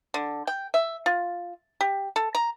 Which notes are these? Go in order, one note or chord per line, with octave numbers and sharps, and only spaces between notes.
D3
G5
E5
F4
G4
A4
A#5